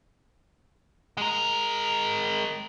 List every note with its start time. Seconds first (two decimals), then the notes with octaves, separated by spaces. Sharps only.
1.17 G#3 A#4